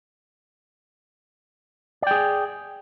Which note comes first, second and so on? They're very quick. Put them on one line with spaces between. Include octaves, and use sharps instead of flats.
D5 G5 G#4